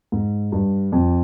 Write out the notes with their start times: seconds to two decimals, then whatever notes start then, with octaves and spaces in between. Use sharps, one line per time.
0.12 G#2
0.52 G2
0.92 F2